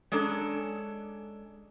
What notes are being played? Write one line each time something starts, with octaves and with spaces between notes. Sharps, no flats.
G#3 C#4 D4 A4 A#5